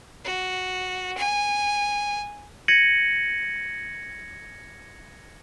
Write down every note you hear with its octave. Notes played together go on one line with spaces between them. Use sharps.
F#4
G#5
G#6 A#6 C#7 D#7 F#7